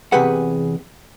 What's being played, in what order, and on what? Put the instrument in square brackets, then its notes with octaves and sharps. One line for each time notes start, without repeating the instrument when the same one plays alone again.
[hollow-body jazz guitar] E2 C3 G4 G#4 B4 F#5